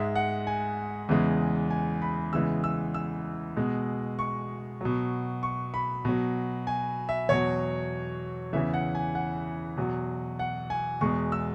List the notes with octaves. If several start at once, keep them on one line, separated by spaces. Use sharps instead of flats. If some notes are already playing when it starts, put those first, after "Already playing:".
Already playing: G#2 G#3 E5
F#5
G#5
E2 C#3 E3 G#3
G#5
B5
E2 C#3 E3 G#3 E6
E6
E6
B2 G#3
C#6
B2 F#3
C#6
B5
B2 F#3
G#5
E5
E2 B2 F#3 C#5
E2 C#3 E3 E5
F#5
G#5
F#5
E2 B2 F#3
F#5
G#5
E2 B2 G#3 C#6
E6